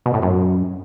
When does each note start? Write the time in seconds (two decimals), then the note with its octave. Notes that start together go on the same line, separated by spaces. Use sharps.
0.06 B2
0.14 A2
0.22 F#2